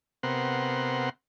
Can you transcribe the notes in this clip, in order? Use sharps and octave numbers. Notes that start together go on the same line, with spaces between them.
C3 B3 A#4 F#5 C6